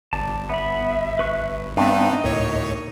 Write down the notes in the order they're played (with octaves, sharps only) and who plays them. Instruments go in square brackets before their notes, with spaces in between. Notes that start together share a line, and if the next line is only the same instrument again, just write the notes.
[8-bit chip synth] G1 [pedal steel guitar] D5 A5
[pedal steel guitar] B3 B5 [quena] E5
[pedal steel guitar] B4 C#6 F#6
[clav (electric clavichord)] G2 E5 A5 [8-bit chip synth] B3 C4 D4 [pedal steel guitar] D#4 [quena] D#5
[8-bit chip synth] D2 A2 C#5 [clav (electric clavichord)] A#3 A#4